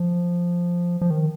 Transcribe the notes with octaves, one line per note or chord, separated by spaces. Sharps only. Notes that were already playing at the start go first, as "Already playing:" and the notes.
Already playing: F3
F3
D#3